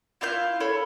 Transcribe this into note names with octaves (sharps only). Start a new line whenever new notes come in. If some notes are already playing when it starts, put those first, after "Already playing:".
E4 F4 F5 G6
A4 C#5 B5